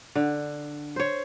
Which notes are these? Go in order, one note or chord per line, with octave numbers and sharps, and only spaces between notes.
D3
C5 C#5